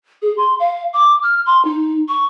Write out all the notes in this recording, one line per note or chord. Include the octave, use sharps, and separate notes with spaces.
G#4
C6
F5
D6
F6
C6
D#4
C#6